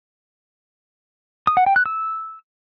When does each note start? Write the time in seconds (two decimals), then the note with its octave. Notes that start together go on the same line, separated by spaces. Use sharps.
1.47 D#6
1.57 F#5
1.66 G5
1.76 F#6
1.86 E6